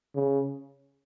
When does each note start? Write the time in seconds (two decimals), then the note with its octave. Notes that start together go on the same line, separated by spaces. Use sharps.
0.15 C#3